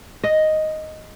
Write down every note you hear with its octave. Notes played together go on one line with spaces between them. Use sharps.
D#5